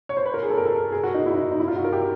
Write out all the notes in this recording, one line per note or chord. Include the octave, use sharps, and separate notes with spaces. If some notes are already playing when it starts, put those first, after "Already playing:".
C#5
C5
B4
A#4
G#4
A4
A#4
A4
G#4
F#4
D#4
E4
D#4
D#4
E4
F4
F#4
A#4
G4